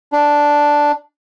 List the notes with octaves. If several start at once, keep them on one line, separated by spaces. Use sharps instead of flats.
D4